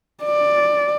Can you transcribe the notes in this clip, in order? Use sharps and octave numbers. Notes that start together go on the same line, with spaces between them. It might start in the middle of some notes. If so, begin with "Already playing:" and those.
D5